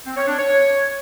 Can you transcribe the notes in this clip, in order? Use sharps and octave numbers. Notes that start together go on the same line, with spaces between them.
C4
C#5
D4
C#5